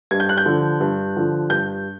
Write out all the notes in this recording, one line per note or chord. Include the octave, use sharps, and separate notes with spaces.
G2 G#6
G6
F#6
G6
D3 F3
G2
D3 F3
G2 G6